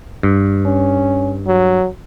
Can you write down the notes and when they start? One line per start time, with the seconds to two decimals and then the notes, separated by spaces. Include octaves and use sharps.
0.23 G2
0.65 C#4
1.46 F#3